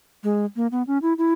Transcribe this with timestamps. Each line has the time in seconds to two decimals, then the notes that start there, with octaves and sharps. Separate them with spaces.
0.24 G#3
0.56 A#3
0.72 B3
0.87 C#4
1.02 E4
1.18 E4